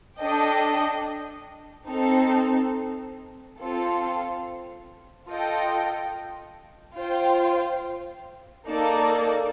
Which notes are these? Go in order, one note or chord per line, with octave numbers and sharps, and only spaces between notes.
D4 A4 D#5 G5
C4 D#4 A4
C4 F4 A4
F4 A4 D#5 G5
F4 C5 G5
A#3 D#4 A4 D5